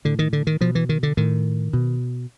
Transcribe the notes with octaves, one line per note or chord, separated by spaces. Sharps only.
A2 D3
D#3
D3
D#3
B2 F3
E3
D#3
D3
A2 D#3
B2